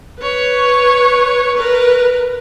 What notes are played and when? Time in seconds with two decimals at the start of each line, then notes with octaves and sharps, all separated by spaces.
0.19 B4 C#5
1.55 A#4 B4